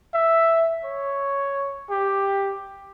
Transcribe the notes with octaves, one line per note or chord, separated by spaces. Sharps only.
E5
C#5
G4